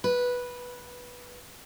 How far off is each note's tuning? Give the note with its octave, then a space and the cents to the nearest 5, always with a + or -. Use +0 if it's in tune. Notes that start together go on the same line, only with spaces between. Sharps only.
B4 -10